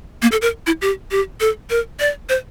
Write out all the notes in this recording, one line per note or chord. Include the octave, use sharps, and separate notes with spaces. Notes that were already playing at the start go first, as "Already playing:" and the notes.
A#3
A4
A#4
E4
G4
G4
A4
A#4
D5
C5